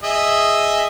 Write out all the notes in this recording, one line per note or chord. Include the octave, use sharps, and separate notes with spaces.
G#4 D#5 E5